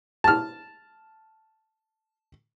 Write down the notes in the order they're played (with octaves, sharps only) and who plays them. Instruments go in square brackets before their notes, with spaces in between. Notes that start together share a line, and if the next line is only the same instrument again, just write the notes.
[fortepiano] A5 F6